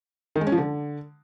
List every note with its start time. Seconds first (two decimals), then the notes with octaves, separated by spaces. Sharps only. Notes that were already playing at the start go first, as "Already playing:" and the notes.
0.36 D#3
0.41 G#3
0.47 C#4
0.52 F3
0.58 D3